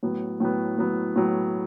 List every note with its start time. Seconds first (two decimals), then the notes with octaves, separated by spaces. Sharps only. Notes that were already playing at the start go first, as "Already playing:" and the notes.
0.03 A2 F#3 B3
0.40 A2 F#3 B3
0.78 A2 F#3 B3
1.16 A2 F#3 B3